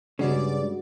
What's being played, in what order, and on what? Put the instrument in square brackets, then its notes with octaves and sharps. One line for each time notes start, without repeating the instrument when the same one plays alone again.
[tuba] G2 [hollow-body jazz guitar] C#3 [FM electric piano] G#3 F#4 [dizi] D5